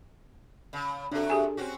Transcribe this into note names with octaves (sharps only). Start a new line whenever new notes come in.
C#3
C3 D4 F#4 A4
G4 G#4 G#5
C4 C#4 F#4